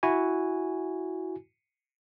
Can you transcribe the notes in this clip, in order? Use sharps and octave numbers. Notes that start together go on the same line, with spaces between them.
E4 F#4 G#5